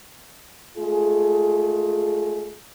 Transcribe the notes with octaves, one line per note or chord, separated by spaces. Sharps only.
G#3 A3 F4 G#4